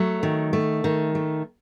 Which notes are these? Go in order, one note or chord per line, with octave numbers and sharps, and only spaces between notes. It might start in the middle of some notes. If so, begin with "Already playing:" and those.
Already playing: F#3 A3
D#3
A3
D#3
A3